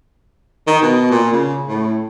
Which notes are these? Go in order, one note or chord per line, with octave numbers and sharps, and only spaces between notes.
D#3
B2
A#2
C#3
A2